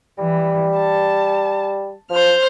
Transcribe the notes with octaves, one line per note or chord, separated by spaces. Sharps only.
E3 G3
A5
F3 C5 F6